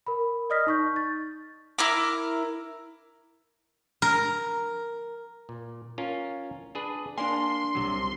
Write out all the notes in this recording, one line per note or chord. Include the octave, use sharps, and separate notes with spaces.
A#4 B5
D5 D#5 D#6 F6 A#6 B6
D#4 C#6 G6
A6
E4 A#4 D6
A#4
A#2
C#4 F4 A#4
D4 G#4 B4
A#3 D4 D5 G#5 C6
C2 C3 F#3